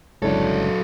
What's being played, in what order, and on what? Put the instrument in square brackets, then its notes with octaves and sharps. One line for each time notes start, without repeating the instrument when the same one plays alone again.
[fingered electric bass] G1 C#3 G#3 [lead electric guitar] F#3 A4 [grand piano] D4 E4 C#5